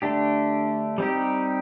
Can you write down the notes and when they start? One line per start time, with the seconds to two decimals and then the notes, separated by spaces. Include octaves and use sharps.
0.02 D3 A3 D4 G4
0.98 G3 C4 D#4 G4